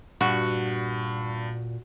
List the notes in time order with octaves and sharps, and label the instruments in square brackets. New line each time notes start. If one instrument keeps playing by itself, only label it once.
[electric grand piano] G2 [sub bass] A#2 [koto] F#4